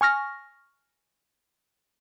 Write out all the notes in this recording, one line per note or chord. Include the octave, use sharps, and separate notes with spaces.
G#5 C#6 F6 A#6